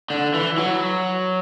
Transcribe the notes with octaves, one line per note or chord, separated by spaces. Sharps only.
D3
E3
F#3